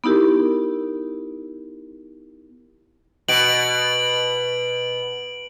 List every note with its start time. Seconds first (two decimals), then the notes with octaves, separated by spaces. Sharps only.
0.04 B3 D#4 E4 G4 A#4
3.28 B2 D7 F#7